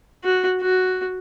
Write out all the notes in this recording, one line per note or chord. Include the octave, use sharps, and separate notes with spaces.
F#4
F#4